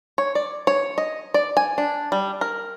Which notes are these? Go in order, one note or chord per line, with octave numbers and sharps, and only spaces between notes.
C#5
D5
C#5
D#5
D5
G#5
D4
G3
A#4